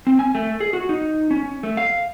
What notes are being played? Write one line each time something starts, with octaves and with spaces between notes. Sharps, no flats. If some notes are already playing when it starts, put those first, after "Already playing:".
C4
G#5
A3
G#4
F#4
D#4
C#4
A3
F5